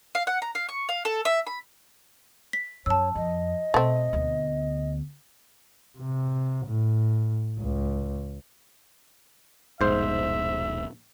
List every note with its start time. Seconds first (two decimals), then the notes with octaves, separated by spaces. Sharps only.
0.15 F5
0.27 F#5
0.42 A#5
0.55 F5
0.69 C#6
0.89 F5
1.05 A4
1.25 E5
1.47 B5
2.53 B6
2.86 F#2 C#5 A5 E6
3.15 F2 D#5
3.74 B2 A3 C4
4.13 D2 B3
5.99 C3
6.66 A2
7.59 C#2
9.81 D#1 A#1 G#2 B2 C5 E5